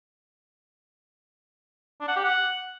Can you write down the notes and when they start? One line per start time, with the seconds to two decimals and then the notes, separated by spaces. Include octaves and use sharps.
2.01 D4
2.08 F#5
2.16 G4
2.24 F#5